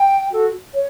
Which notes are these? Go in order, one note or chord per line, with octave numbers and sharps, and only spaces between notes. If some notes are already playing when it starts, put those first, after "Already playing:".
Already playing: G5
F#4 A4
C#5